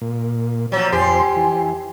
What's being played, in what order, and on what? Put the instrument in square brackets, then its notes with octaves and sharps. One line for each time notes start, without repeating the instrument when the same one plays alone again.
[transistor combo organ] A#2
[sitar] F3 F#3 [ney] C#5
[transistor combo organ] F2 C5 C6 [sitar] G4 [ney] G#5
[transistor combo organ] E3